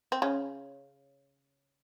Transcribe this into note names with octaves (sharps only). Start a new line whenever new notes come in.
C4
C#3 C#4